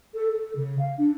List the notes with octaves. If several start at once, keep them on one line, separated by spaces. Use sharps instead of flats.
A4
A4
C#3
F5
D4